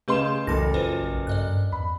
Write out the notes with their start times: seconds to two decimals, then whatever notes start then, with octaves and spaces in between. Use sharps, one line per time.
0.08 C#3 A3 B4 D#5 C6 E7
0.47 F#1 C2 E3 A4 B5 A#6
0.74 A#1 F4 B4 C5
1.27 G2 D5 D#5 F#6
1.49 G2
1.72 E2 B5